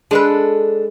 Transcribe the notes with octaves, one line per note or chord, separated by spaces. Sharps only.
G#3 D4 A4 B4